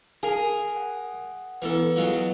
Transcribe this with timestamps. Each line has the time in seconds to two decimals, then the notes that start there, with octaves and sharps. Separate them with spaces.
0.23 G#4 A#4 F5
0.76 F#5
1.62 E3 B3 E4 A4 B4
1.96 F#3 G#3 F4 F#4